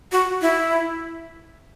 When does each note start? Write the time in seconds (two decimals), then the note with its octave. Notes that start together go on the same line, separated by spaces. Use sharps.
0.12 F#4
0.42 E4